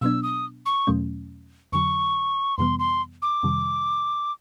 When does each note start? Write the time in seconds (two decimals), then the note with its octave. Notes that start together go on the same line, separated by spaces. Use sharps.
0.01 B2 F#3 B3 D4 E6
0.23 D#6
0.66 C#6
0.87 E2 B2 F#3 A3 C#4
1.72 F2 D3 F#3 C#6
2.58 F2 C3 E3 G3 B3 C6
2.79 C6
3.22 D6
3.43 F2 C3 D#3 G3